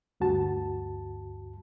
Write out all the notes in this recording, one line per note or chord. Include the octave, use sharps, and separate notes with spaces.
D2 G2 F#4 A5